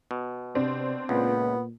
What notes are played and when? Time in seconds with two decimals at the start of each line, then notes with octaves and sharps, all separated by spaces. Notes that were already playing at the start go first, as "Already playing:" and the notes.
0.11 B2
0.55 C3 C4 D4
1.09 C#2 A#2 B3